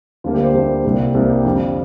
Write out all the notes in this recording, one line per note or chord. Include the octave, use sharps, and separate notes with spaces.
D2 D3 G3 A#3 F4
G4
C5
D2 D3 G3 A#3
C2 C3 G3 A#3
C2 C3 G3 A#3
G4
F2 D3 G3 F4